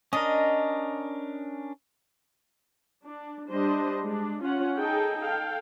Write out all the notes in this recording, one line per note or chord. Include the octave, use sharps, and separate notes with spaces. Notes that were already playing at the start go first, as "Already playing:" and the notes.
C#4 D4 A#4 D#5
D4
G3 D4 C5 D#5
G#3 D4
C#4 F4 F#5
D#4 G#4 A4 G5
A4 F5 G5